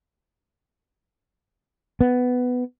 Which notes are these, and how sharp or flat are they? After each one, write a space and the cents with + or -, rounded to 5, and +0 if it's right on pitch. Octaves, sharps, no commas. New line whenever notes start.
B3 +10